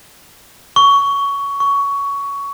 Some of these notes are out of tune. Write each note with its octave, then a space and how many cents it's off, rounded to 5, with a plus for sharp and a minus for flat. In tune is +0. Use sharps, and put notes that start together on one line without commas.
C#6 +15
C#6 +15